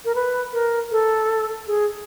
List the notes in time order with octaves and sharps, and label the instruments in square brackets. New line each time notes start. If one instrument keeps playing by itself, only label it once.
[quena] A#4
B4
A#4
A4
G#4